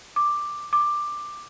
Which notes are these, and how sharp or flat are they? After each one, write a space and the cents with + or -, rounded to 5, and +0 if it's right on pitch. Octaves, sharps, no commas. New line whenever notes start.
D6 +5
D6 +10